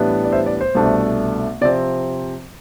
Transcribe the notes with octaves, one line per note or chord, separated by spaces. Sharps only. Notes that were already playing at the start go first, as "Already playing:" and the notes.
Already playing: A2 E3 G3 B3 D4
D5
C5 E5
D5
C5
C2 B2 A3 D4
C3 F3 C4 D5